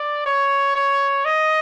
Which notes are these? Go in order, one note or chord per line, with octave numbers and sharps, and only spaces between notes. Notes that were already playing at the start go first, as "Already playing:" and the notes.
Already playing: D5
C#5
C#5
D#5